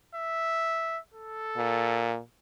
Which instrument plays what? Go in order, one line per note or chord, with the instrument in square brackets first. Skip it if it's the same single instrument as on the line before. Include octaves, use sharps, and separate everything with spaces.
[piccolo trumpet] E5
A4
[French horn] A#2